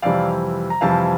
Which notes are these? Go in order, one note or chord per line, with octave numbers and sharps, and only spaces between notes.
F2 C3 E3 G3 D5 F5
A#5
F2 C3 E3 G3 F5 A5